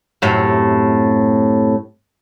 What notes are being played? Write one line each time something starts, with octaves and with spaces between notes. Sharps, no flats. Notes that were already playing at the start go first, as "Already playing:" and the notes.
F#2 A2 C3